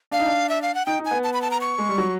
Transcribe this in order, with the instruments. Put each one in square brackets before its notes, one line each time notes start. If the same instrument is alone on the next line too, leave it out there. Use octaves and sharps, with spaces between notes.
[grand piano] D4 [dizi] F5
[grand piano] D#4
D4
[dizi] E5
F5
F#5
[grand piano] D#4 [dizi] G5
[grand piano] D#4
[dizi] G#5
[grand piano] B3
[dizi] A5
B5
A5
A#5
C#6
[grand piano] G#3
G3
F#3